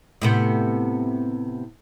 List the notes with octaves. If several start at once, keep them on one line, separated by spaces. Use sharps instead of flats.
A2 C3 B3